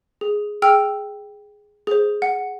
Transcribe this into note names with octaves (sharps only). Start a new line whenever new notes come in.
G#4
G#4 G5 E6 F6
G#4 C5
F#5